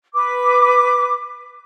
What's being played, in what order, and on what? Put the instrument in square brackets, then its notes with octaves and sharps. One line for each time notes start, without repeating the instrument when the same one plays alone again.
[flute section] B4 D6